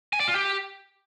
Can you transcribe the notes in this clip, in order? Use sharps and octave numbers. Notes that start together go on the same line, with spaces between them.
G#5
D5
F4
G4